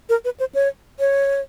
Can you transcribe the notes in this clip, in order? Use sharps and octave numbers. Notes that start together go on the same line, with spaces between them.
A#4
B4
C5
C#5
C#5